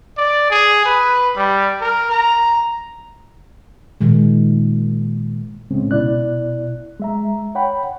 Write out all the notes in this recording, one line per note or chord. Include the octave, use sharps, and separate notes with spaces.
D5
G#4
B4
G3
A#4
A#5
A#2 D#3 G#3
C#2 A2 C#3 G#3 C4 C#4
B2 E4 D5 F#6
G#3 E5 A#5
C#5 F#5 G5 B5